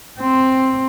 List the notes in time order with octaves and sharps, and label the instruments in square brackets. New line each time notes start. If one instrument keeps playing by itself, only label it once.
[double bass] C4